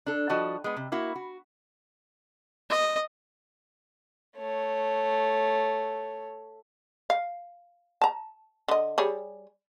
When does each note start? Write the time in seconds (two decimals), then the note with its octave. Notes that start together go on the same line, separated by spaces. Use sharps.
0.06 D4 A4
0.29 F3 G3 F#4 D#5 A5
0.64 G#3 B3
0.77 C3
0.92 A#3 E4 F#4
1.16 F#4
2.70 D#5
4.37 A3 C#5
7.10 F5
8.01 A5 A#5
8.68 D3 D#5
8.98 G3 G#4 C#5